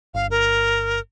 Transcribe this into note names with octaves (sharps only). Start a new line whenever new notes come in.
G1 F5
A#4